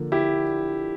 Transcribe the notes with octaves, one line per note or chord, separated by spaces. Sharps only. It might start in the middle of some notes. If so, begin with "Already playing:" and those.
Already playing: D3 F3 A#3
E4 G4